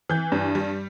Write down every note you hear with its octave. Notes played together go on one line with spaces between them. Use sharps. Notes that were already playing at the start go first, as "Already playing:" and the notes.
E3 G6
G2
G3